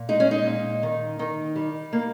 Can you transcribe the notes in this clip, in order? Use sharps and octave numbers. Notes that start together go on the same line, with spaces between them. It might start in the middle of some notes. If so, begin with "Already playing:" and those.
Already playing: A#2
G#3 D#4
C#4
D#4
A#2
D#3
D#3
G3
A#3